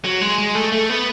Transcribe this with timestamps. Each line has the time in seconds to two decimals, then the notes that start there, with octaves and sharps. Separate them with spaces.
0.05 F#3
0.21 G#3
0.38 G#3
0.55 A3
0.72 A3
0.90 B3